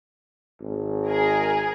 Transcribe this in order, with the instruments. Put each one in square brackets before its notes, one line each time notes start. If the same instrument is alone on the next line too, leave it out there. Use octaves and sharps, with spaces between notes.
[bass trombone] G#1
[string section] G#4 A#4